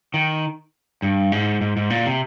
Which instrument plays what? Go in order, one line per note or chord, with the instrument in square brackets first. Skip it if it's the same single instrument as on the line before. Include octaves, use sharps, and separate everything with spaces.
[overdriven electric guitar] D#3
G2
G#2
G#2
G#2
A#2
C3